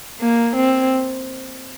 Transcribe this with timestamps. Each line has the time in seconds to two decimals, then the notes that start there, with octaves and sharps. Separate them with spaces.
0.20 A#3
0.56 C4